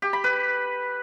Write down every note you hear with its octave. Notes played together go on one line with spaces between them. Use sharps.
G4
B5
B4